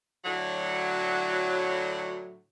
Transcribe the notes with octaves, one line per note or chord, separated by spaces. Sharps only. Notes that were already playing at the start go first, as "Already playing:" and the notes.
A2 D3 F#3